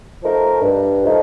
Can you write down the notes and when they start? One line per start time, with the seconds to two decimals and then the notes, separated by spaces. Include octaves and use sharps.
0.21 F3 A3 D#4 A#4
0.61 G2
1.02 F3 A3 D#4 A#4